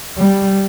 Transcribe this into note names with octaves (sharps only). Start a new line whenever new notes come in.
G3